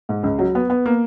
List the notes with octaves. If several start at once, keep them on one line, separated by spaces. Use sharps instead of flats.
G#2
C#2
F#3
B3
B3
A#3